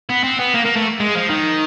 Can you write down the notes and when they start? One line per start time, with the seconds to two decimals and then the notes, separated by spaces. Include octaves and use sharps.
0.09 B3
0.24 C4
0.39 B3
0.54 A#3
0.66 A#3
0.77 A3
1.00 G#3
1.15 F3
1.30 D#3